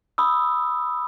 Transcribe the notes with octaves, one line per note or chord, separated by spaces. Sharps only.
B5 D#6 E6